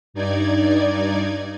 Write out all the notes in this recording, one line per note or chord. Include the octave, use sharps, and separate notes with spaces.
G2 D#4 D5 G#6